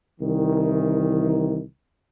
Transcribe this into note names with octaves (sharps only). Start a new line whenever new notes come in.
C2 D#3 E3